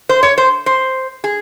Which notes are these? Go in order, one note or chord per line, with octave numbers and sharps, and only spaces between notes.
C5
C#5
C5
C5
G#4